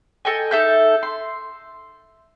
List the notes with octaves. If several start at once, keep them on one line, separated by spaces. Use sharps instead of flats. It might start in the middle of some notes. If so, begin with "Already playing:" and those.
A4 D#5 G5 G#5
D#4 A4 E5 G6
C6